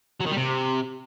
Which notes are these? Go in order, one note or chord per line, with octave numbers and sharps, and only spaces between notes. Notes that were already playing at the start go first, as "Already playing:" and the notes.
F#3
D#3
G3
C3